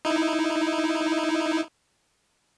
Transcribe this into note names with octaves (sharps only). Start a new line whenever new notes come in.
D#4 E4